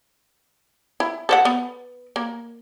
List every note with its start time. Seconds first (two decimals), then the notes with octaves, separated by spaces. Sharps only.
1.00 E4
1.29 A4 C5 F#5
1.45 B3
2.16 A#3